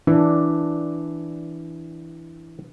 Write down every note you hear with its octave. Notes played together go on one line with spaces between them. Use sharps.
E3 D4